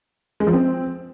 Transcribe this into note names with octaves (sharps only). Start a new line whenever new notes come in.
G#3
F3
C4